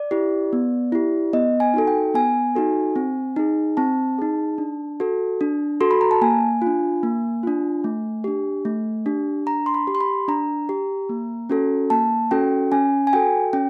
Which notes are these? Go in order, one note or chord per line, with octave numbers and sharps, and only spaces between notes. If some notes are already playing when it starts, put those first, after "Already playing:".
Already playing: D5
E4 G4
B3
E4 G4
B3 D#5
G#5
D#4 F#4 A4
G5
B3 G#5
D#4 F#4 A4
C4
D#4 G#4
C4 A5
D#4 G#4
D4
F#4 A4
D4
F#4 A4 C6
B5
A#5
A5
A#3 G#5
F4
D4
A#3
D4 F4
A3
D4 G4
A3
D4 G4
D4 A#5
C6
B5
G4
C6
B5
D4 A#5
G4
A#3
C#4 F#4 A4
A#3 A5
C#4 F#4 A4 G5
C#4 G#5
G#5
F#4 A4 G5
C#4 G5